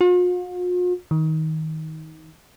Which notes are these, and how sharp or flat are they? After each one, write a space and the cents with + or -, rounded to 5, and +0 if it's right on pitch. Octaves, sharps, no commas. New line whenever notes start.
F4 +45
D#3 +20